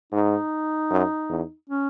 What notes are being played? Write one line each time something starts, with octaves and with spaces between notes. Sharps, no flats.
G#2 D#4
F#2
E2
C#4